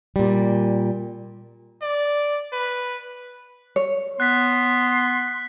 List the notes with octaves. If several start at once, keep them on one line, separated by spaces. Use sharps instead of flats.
A#2 G3
D5
B4
C#5
B3 C6 F#6 B6